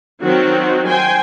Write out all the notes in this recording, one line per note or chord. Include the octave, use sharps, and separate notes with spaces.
D#3 F#3 C4 F#4
C5 G5 G#5